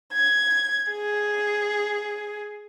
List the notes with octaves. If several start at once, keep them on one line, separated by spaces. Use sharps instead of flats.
G#6
G#4